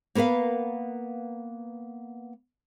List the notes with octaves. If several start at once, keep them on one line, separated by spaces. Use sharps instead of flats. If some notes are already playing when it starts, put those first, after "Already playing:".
A#3 B3 A#4 B4 F5